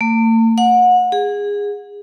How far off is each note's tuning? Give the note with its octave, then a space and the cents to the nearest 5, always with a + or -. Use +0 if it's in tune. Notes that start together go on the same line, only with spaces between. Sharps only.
A3 +45
F#5 -30
G#4 -20